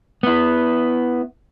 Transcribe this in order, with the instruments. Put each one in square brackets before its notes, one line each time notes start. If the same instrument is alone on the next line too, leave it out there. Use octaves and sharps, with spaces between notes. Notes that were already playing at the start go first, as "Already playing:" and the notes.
[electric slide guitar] B3 E4